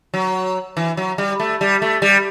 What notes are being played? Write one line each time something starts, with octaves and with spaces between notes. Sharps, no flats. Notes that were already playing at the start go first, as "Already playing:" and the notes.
F#3
E3
F#3
G3
A3
G3
A3
G3